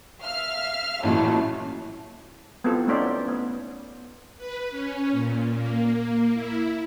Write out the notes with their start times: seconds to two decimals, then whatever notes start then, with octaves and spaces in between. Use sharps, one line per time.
0.23 E5 F5 F6
1.03 A1 A#2 E3 F#3 G#3 A3
2.64 B3 C4 E4 F4 A4
2.87 A3 B3 C#4 D#4 C5 D5
3.28 B3
4.37 B4
4.71 C#4
5.12 A#2
5.54 A#3
6.34 E4